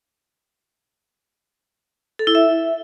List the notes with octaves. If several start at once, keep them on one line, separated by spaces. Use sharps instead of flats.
A4
E4
E5